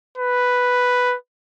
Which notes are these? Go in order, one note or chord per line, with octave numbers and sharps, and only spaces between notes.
B4